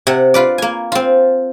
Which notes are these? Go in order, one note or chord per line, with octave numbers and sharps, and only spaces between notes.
C3 F#5
F4 B4 D5
A#3 G#5
C4 F4